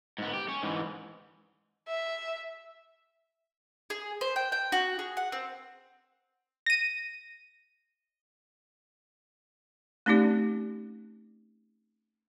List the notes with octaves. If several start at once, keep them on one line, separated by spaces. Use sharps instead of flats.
G#2 B3
G4
C#4
G#2 E3
E5
G#4
C5
G5
G5
F#4
G#4
F#5
C4
A#6 D#7
A3 C4 C#4 D#4 G4 D5